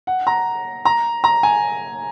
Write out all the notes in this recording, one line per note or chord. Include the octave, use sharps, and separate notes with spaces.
F#5
A#5
A#5
A#5
G#5